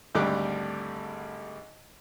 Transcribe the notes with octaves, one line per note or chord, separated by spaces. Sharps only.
G#1 D2 D3 G3 D6 F#6